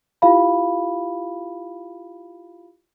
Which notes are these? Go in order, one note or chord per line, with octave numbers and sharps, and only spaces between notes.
E4 F4 G4 F5 B5